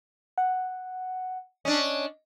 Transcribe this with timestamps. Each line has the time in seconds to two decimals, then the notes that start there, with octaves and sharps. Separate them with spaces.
0.38 F#5
1.65 C#4 D4 D#5